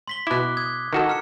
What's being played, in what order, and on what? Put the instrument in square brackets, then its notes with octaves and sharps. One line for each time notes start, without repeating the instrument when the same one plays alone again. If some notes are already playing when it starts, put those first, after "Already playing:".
[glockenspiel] C6 B6 G7
[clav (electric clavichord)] B2 E4 [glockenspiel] D6 F#6
[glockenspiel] D#6 G#6
[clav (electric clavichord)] D#3 F#4 A4
[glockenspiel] A#5 F6 C#7